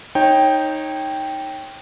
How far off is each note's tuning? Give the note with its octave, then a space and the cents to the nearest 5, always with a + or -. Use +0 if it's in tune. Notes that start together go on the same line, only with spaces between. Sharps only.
D#4 +0 C#5 -25 G5 +0